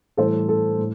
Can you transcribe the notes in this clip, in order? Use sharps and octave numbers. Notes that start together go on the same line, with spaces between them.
A2 E3 G3 A4 C5
A4
A2